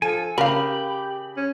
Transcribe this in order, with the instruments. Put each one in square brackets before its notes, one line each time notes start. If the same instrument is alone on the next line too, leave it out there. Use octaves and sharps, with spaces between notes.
[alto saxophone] F3 [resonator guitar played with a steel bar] A4 [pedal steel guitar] G#5
[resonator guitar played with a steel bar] C#3 [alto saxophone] G4 [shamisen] A#4 F5 [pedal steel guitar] B5
[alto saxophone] C#4